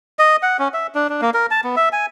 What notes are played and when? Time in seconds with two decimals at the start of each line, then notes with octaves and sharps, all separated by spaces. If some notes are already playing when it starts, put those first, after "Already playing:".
0.19 D#5
0.43 F#5
0.59 C#4
0.74 E5
0.95 D4
1.09 D4
1.22 A#3
1.34 A#4
1.51 A5
1.64 B3
1.76 E5
1.93 G#5